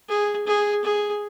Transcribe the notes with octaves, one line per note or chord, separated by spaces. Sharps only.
G#4
G#4
G#4